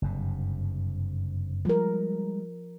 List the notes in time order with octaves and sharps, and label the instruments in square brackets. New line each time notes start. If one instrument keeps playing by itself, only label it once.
[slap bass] F#1 G2 C3
[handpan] F3 A#4 [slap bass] G3 G#3